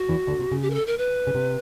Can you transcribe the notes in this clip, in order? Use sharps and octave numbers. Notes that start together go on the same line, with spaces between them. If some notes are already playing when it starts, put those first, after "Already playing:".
Already playing: F#4
E2 E3
D2 D3
C3
C#3
G4
A#4
A4
A#4
B4
C#3
C3